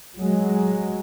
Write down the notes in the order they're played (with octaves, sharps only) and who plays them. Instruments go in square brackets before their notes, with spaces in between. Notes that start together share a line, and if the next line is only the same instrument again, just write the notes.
[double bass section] F#3 G#3